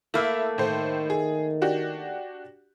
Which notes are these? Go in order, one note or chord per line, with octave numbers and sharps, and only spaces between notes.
A3 A#3 E4 E5
A2 D#3 C5
G#4
D4 F#4 G4